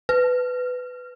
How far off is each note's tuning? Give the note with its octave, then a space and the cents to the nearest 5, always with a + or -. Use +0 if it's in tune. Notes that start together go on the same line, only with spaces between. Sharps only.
B4 +15